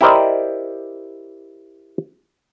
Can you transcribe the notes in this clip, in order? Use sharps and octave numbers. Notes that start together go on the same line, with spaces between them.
E4 G4 A#4 C5 D5 D#5